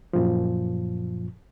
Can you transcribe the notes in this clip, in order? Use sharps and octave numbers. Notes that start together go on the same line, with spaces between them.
F#2 A#2 F3